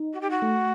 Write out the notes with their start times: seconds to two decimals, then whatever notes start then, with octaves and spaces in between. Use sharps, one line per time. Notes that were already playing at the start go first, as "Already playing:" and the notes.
Already playing: D#4
0.13 F#4
0.21 G4
0.30 F#4
0.42 A3